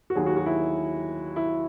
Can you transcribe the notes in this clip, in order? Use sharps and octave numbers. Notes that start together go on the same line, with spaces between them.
F#4
D#2 D#3 F#3 G#4
F#4
F#4
E4
E4